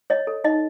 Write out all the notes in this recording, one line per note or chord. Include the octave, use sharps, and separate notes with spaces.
C#5 D#5
A4
D#4 D#5